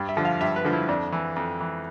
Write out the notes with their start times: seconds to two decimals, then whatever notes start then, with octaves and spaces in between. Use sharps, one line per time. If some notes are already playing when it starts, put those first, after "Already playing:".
Already playing: G2
0.09 E5
0.17 D3 F3
0.25 F5
0.40 G2 E5
0.56 B4
0.64 D3 F3
0.73 E4
0.89 F2 D4
1.12 E3
1.36 F2
1.61 E3